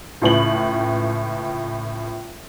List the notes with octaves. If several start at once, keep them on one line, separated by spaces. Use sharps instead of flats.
C#2 A2 B4 F#7